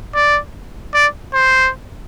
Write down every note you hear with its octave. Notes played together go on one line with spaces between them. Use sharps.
D5
D5
C5